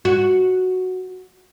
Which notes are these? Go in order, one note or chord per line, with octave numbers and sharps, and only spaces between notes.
F#4